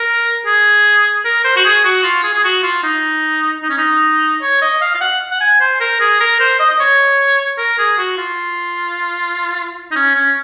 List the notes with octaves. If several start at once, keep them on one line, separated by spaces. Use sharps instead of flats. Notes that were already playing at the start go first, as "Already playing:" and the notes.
Already playing: A#4
G#4
A#4
C5
F#4
G#4
F#4
F4
G#4
G#4
F#4
F4
D#4
D#4
C#4
D#4
C#5
D#5
F5
F5
F#5
F#5
G#5
C5
A#4
G#4
A#4
C5
D#5
D#5
C#5
A#4
G#4
F#4
F4
D#4
C#4
C#4